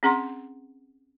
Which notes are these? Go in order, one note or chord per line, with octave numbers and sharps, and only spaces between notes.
C4 C#4 G#4 F#5 A#5 C6